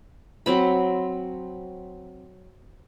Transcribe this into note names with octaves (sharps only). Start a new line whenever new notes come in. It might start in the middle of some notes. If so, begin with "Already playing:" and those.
F#3 C4 B5